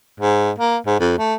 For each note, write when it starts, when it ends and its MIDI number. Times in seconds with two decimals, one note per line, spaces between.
0.20 0.51 44
0.58 0.77 58
0.86 0.96 44
1.00 1.17 41
1.18 1.35 57